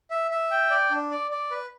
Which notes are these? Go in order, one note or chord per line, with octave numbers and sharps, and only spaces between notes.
E5
E5
G5
D5
D4
D5
D5
B4